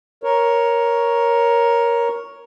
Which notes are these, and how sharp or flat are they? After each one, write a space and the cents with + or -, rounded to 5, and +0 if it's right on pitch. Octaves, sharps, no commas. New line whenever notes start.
A#4 +10 C#5 +0